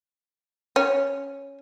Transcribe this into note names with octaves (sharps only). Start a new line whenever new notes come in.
C#4